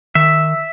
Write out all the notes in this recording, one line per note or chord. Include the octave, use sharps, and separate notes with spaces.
D#3 E5